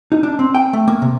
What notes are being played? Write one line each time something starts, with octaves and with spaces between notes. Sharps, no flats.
D#4
D4
C4
G5
A3
A#3
C3